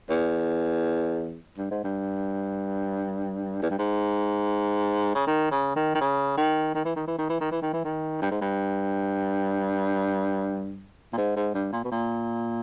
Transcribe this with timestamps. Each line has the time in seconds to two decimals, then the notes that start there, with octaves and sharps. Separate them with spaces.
0.10 E2
1.58 G2
1.71 G#2
1.84 G2
3.62 E2
3.70 G2
3.79 G#2
5.15 C#3
5.27 D#3
5.51 C#3
5.76 D#3
5.95 D#3
6.01 C#3
6.37 D#3
6.74 D#3
6.85 E3
6.96 D#3
7.08 E3
7.18 D#3
7.29 E3
7.41 D#3
7.51 E3
7.62 D#3
7.73 E3
7.84 D#3
8.22 G2
8.31 G#2
8.41 G2
11.13 A#2
11.17 G#2
11.36 G#2
11.54 G2
11.72 A#2
11.84 B2
11.91 A#2